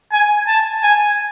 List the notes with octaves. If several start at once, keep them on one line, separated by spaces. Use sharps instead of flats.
G#5
A5
G#5